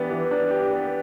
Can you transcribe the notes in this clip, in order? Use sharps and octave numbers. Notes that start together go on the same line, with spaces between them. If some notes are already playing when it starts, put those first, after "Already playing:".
Already playing: E3 B3 D4 G4
E3
D4
G4
B3